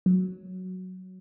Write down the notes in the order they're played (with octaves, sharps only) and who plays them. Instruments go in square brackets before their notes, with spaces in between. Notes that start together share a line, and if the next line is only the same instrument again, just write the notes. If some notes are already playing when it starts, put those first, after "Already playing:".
[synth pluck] F#3